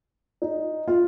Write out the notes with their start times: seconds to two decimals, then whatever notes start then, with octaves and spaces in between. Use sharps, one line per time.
0.42 D#4
0.87 F4